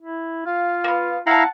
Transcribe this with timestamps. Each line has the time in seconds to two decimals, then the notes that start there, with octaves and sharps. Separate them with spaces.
0.02 E4
0.46 F4 F5
0.84 A#3 B3
1.27 E4 F5 F#5 A5 A#5